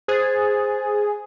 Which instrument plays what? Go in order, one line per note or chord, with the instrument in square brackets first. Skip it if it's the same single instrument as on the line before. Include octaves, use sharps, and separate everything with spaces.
[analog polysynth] G#4 [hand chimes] C5 F#6 A6